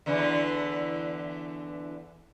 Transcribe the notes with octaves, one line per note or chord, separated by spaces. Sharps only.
E2 D3 E3